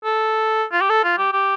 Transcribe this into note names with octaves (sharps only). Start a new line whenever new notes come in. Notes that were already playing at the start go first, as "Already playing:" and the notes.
A4
F4
G4
A4
F4
G4
G4